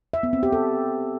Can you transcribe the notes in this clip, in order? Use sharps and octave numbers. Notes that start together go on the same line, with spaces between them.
E5
B3
C4
G4
A4